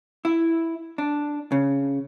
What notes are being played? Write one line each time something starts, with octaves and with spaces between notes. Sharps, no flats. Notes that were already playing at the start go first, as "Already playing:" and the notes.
E4
D4
C#3